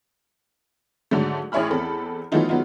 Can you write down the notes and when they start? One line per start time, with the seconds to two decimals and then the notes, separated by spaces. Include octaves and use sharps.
1.11 G#2 D3 F#3 A3
1.52 A1 G#4 C#5 E5 B5 F6
1.70 E2 C4 A4 B5
2.32 E3 F#3 A3 B3 D#4 F4
2.49 F#3 G#3 B3 D#4 F4